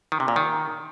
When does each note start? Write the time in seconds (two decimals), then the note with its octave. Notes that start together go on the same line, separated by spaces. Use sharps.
0.12 D#3
0.20 C3
0.28 A#2
0.36 D#3